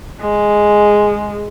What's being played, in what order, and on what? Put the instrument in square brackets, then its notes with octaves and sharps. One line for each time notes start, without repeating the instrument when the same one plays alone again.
[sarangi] G#3